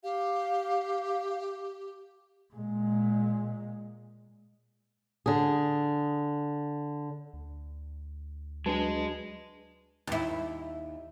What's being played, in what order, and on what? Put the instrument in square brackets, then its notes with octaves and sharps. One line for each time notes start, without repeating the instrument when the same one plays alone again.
[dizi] G4 [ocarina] F5
[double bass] A#2 G#3
[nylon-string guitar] D3 G#4
[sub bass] D2
[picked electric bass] F#3 [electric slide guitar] G#3 G#4 [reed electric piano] D4 B4 A5
[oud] D#2 E4